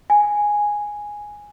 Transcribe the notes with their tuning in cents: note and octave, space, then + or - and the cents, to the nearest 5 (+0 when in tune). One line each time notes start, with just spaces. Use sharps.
G#5 -5